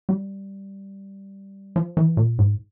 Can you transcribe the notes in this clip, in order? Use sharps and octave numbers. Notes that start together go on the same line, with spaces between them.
G3
F3
E3
A#2
G#2